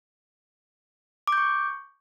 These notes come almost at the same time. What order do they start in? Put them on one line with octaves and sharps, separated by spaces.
D6 G6 C#6